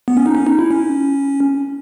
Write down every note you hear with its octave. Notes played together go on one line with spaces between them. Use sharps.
B3
C#4
D#4
C#4
D#4
E4
C#4